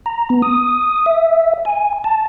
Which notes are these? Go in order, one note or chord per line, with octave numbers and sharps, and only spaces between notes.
A#5
B3
D#6
E5
G#5
A5